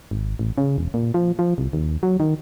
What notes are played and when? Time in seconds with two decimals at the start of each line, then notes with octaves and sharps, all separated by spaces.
0.11 G#1
0.39 A1
0.58 C#3
0.78 E1
0.94 A#2
1.14 F3
1.39 F3
1.58 C2
1.73 D#2
2.03 F#3
2.20 D#3